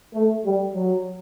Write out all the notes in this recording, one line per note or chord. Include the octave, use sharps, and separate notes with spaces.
A3
G3
F#3